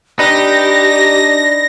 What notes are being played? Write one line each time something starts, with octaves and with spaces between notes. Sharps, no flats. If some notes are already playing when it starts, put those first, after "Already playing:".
D4 D#4 G4 B4 A#6